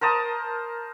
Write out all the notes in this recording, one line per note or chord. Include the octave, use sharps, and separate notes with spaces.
A#4 C5 A5 D#6